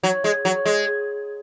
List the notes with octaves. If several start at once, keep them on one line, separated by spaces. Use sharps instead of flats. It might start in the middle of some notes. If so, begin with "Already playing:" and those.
F#3
G#3
F#3
G#3